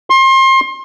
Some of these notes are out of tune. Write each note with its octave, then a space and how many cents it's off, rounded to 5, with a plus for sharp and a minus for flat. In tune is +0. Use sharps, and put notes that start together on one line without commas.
C6 +30